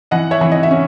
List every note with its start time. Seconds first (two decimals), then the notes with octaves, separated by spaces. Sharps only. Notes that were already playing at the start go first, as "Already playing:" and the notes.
0.11 E3 D#5 F#5
0.31 C#5 E5
0.41 E3
0.51 D#5
0.63 E5
0.71 C#4